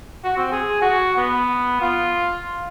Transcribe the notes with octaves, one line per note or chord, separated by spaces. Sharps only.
F#4
C4
G#4
F#4
B3
F4